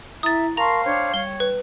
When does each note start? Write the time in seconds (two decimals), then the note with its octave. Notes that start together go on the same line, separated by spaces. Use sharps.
0.23 E4 E5 A#5 D#6 A6
0.57 A#4 F5 A5 A#5 C6 C#6
0.85 D4 C5 C#5 G5
1.14 G3 C#5 G7
1.40 B4